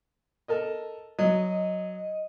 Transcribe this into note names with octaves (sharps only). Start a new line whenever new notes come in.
A4 A#4 D#5
F#3 D#5